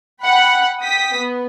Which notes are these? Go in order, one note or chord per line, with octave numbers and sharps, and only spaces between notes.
F#5 G5 B5 F#6
G5 D#6 B6
B3